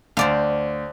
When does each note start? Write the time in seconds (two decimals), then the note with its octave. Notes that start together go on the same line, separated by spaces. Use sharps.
0.17 D2 C5 D5 F5